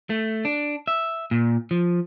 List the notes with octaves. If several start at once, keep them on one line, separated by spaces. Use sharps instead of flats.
A3
D4
E5
A#2
F3